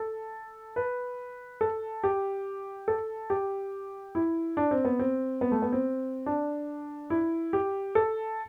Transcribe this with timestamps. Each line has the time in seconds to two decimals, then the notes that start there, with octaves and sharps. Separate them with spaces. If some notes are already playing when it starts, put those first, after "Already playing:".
Already playing: A4
0.76 B4
1.61 A4
2.04 G4
2.88 A4
3.30 G4
4.15 E4
4.57 D4
4.71 C4
4.85 B3
4.99 C4
5.41 B3
5.52 A3
5.62 B3
5.73 C4
6.26 D4
7.10 E4
7.53 G4
7.95 A4